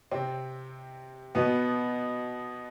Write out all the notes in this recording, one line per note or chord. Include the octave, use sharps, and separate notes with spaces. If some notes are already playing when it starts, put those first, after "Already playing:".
C3 C4
B2 B3